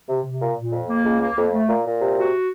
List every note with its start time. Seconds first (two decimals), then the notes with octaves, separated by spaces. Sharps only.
0.09 C3
0.25 C3
0.41 A#2
0.57 A#2
0.72 F2
0.89 A#3
1.05 C#2
1.20 A#3
1.36 F2
1.52 A3
1.68 A#2
1.85 A#2
2.00 C3
2.16 F#4